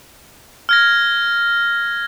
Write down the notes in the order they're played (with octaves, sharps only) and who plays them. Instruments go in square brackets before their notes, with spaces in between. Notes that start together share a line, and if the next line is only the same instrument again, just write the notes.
[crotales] F6 G#6 A#6